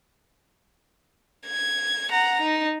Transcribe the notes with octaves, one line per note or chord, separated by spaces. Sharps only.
G#6
F#5 A#5
D#4